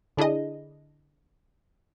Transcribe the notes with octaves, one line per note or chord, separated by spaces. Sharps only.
D3 D4 E4 G#4 D#5